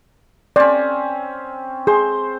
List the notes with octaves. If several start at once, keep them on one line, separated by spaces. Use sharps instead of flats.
C4 C#4 D5
G#4 C5